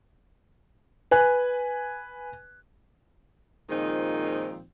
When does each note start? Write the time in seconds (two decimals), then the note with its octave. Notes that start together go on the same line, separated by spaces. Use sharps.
1.11 B4 G#5 F#6
3.69 A#2 D#3 F3 G#3 C4 D#4